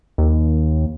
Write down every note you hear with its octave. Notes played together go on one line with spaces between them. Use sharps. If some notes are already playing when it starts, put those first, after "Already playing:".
D#2